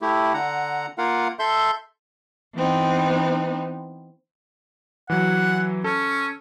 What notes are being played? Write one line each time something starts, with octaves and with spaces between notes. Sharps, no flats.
A3 E4 G4
D3 F#5 A#5
A#3 F4 A#4 F5 F#5
A4 E5 C6 G6
E3 B3 C4 D#4
E3 F#3 F#5
C#4 A4